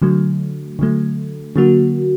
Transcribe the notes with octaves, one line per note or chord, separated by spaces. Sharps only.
D3 F#3 A3
D3 F#3 A3
D3 F#3 A#3 F#4